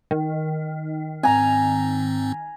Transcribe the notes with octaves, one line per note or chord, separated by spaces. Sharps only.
D#3
G#2 C4 G#5 A#5